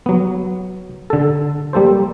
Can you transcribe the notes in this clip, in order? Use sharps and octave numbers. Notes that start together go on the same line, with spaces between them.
F#3 B3
D3 A4
G3 A#3 A4 C5